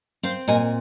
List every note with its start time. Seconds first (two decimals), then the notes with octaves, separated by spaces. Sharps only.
0.23 C4 C5 F5
0.48 A#2 D#5 G#5